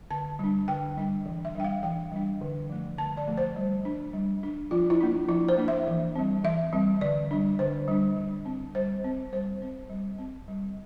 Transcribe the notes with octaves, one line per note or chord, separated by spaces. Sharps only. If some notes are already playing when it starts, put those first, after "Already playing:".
D3 A5
G3 D4
D3 G5
G3 D4
E3
E5
G3 D4 G5
F5
E3 G5
G3 D4
D3
F3 A3
D3 A5
D5
F3 A3
C5
G3
D4
G3
D4
F3 F4
E4
A#3 D4
F3 E4
C5
A#3 D4
E5
E3
G3 C4
E3 E5
G3 C4
D3 D5
G3 D4
D3 C5
G3 D4
G3
C4
G3 C5
C4
G3 C5
C4
G3
C4
G3